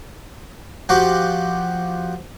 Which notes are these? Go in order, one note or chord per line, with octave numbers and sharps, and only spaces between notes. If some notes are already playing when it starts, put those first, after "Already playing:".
F3 F#4 G4